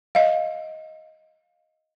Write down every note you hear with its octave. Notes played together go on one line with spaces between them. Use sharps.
D#5 F5